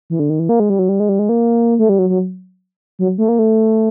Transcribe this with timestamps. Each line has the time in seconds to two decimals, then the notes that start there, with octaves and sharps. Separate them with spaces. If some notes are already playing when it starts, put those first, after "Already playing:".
0.10 E3
0.19 D3
0.30 D#3
0.40 E3
0.49 A#3
0.60 G#3
0.70 G3
0.79 F#3
0.89 G3
1.00 G#3
1.09 G3
1.19 G#3
1.29 A#3
1.79 A3
1.89 G3
1.99 F#3
2.09 F#3
2.99 F#3
3.18 A3
3.29 A#3
3.39 A3